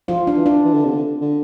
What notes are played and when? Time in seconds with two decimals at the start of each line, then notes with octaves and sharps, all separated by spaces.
0.08 F3 F4
0.27 D4
0.36 E3
0.46 D4
0.65 E3
0.74 D3
0.84 C3
0.94 D3
1.21 D3